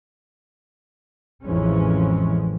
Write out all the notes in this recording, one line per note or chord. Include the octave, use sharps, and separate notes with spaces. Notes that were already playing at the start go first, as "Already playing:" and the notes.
A1 F2 E3 G#3 C#4